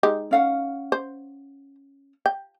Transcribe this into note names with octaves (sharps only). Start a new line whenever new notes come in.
G#3 D#4 G4
C#4 F5 F#5
C5
G5